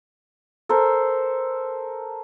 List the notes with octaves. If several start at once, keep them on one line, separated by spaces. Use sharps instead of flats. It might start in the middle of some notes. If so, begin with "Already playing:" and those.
A4 A#4 C5